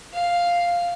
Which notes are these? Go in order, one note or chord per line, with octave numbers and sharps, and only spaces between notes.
F5